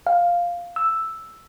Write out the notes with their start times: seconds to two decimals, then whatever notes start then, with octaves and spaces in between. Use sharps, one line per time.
0.07 F5
0.76 E6